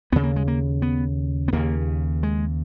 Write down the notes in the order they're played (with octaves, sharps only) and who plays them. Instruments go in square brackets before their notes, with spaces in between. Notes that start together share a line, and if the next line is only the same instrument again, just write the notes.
[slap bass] D#2 C#3 B3
A#3
G#3
A#3
B3
B3
D#2 C#3 A#3
G#3